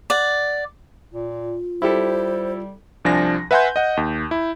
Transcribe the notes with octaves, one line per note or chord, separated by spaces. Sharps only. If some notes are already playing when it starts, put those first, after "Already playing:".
D5 F#5
A#2 F4
G3 E4 G4 A4 C5
C2 F3 D4 G#5 A#6
B4 E5 F#5 G#5 C6 G6
D#5 F#5
D#2
E4